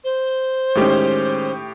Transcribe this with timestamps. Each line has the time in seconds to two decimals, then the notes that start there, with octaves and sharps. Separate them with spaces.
0.04 C5
0.75 A2 D#3 G#3 C#4 G4